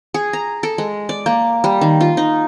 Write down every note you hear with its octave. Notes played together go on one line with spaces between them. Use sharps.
G#4
A#5
A4
G#3
D5
A#3
G3
D#3
F4
D#4